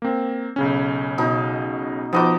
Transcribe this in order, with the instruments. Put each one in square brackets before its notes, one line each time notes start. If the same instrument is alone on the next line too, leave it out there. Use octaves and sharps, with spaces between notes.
[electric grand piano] A#3 C4
B1 C#3 C#4
[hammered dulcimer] B2 D#4
[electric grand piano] F3 D#4 F#4 [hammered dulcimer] B3 D#5 D6